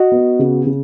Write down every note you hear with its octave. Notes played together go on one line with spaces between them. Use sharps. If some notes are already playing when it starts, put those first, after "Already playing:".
Already playing: F#4 D#5
B3
C#3
C#3